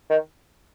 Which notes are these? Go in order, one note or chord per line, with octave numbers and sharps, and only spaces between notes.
D#3